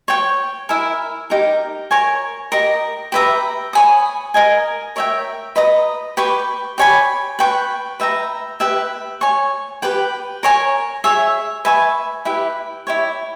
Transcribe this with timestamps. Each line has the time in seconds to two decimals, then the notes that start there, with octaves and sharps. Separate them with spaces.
0.08 C#5 G5 C#6
0.69 E4 A#4 E5 G#5
1.30 D#4 G4 A#4
1.91 A#4 C#5 G#5 C#6
2.52 G4 A#4 D#5
3.12 G4 B4 E5 A#5
3.73 C#5 G#5 B5 D#6
4.34 A#4 D#5 G#5
4.96 A#4 C#5 E5 G5
5.56 B4 D#5 A#5 D#6
6.17 G4 B4 G5 C#6
6.78 G4 C#5 G#5 B5
7.39 B4 G5 C#6
8.00 B4 E5 G5 A#5
8.60 G4 B4 E5 G5
9.21 C#5 G#5 C#6
9.82 G4 B4 G5
10.43 A#4 C#5 G#5
11.04 G#4 C#5 E5
11.65 B4 E5 G#5 C#6
12.25 E4 G4 B4 E5
12.87 E4 G4 C#5